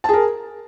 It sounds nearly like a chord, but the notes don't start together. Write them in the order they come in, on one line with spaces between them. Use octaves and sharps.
A5 G#4 A#4